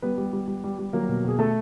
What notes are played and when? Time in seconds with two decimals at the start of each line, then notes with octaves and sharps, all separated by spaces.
0.02 G3 B3 B4
0.18 G3
0.33 G3
0.48 G3
0.64 G3
0.79 G3
0.93 F#3 A#3 A#4
1.09 B2
1.24 B2 G#4
1.39 A3 A4